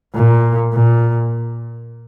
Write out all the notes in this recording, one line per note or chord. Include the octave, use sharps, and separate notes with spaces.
A#2
A#2